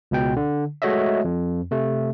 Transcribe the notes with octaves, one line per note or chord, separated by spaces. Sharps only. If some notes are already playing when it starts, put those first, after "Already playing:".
C#2 B2 G5
D3
G#3 A3 F#4 C#5 D#5 E5
F2
C3 A3